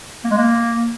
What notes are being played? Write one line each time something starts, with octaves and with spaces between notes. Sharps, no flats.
A#3
G#3
A#3